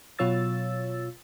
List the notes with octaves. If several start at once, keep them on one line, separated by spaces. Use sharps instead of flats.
B2 F#3 F4 C#5 E6 A6